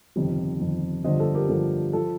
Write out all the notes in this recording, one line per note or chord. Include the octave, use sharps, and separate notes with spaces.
G1 F2 C3 D#3
G1 F2 C3 D#3
G1 G2 D3 F3 C5 D#5
A4 C5
G4 A#4
G1 G2 D3 F3 A4
F3 A4